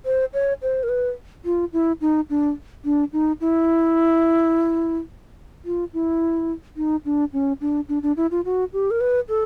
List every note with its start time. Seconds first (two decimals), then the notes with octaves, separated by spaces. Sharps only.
0.05 C5
0.34 C#5
0.62 C5
0.83 A#4
0.89 B4
1.45 F4
1.73 E4
2.01 D#4
2.30 D4
2.85 D4
3.13 D#4
3.41 E4
5.65 F4
5.94 E4
6.77 D#4
7.05 D4
7.33 C#4
7.61 D4
7.89 D4
8.03 D4
8.17 E4
8.31 F4
8.45 F#4
8.73 G4
8.91 A#4
9.01 B4
9.29 A4